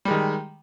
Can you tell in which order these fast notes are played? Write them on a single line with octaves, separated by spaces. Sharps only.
G3 G#3 D#3